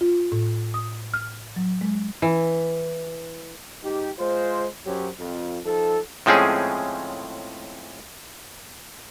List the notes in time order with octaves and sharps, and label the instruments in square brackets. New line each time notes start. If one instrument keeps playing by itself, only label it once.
[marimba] F4
A2
D#6
F6
F#3
G#3
[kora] E3
[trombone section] G#2 D#4 G4
G#3 F4 C5
F#2 F#3 C#4 G4 C5
F2
F3 D#4 A4
[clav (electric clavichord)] A2 F3 G#3 C4 C#4 G#4